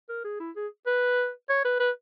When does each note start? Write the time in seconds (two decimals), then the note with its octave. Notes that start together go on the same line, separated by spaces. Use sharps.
0.09 A#4
0.24 G#4
0.40 E4
0.56 G#4
0.86 B4
1.49 C#5
1.65 B4
1.80 B4